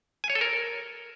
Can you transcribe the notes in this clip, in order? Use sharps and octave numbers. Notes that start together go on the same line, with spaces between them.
G#5
C#5
A4
A#4